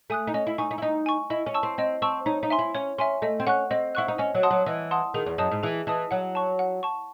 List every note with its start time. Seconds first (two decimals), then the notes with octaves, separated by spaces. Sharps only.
0.10 A3 G#5 D#6 F#6
0.27 D#4
0.34 C#4 D#5
0.47 E4
0.58 D#4 G#5 C#6
0.71 D#4
0.78 E4
0.82 D#4 D#5
1.06 G#5 C#6
1.30 E4 D#5
1.46 C#4
1.54 A5 C#6 E6
1.63 C4
1.78 C4 D#5
2.02 C4 A5 C#6 E6
2.26 D#4 C#5
2.43 D#4
2.50 E5 G#5 C6
2.59 E4
2.75 C#4 C#5
2.98 C#4 E5 G#5 C6
3.22 A3 D#5
3.40 C4
3.47 C#4 F#5 C#6 F#6
3.71 C4 D#5
3.95 E4 F#5 C#6 F#6
4.08 D#4
4.18 C#4 D#5
4.35 F#3
4.43 F#5 A5 C6 D#6
4.51 F#3
4.66 E3 D#5
4.91 F#5 A5 C6 D#6
5.14 D#3 G#4
5.26 E2
5.38 F#2 D#5 A5 D#6
5.51 G#2
5.63 E3 G#4
5.87 E3 D#5 A5 D#6
6.11 F#3 F#5
6.35 A5 C#6
6.59 F#5
6.83 A5 C#6